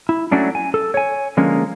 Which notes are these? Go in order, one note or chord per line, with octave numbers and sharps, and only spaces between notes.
E4
F#3 A3 C#4 D4 E4
G#5
A4
C#5 G#5
D3 F3 G#3 A#3 C#4